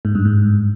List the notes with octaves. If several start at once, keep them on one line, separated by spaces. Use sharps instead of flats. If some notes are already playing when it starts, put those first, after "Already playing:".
G#2
G2
G#2